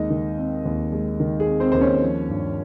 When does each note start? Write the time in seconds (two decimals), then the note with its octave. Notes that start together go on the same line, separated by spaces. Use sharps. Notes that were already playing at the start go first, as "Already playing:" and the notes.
Already playing: D#2 G#3 C4 D#4 D#5
0.10 D#3
0.37 C4
0.65 D#2
0.92 G#3
1.20 D#3
1.40 G#4
1.47 C4
1.60 C4 C5
1.72 D#2 C5
1.81 C#4 C#5
2.02 F3
2.29 G2